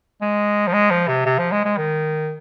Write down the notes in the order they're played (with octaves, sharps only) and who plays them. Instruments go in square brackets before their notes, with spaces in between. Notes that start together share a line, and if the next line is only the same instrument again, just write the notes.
[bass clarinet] G#3
F3
G#3
F3
C3
C3
F3
G#3
G#3
D#3